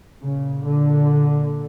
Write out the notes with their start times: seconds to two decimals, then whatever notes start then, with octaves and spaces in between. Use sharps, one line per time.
0.22 A#2 C#3
0.67 D3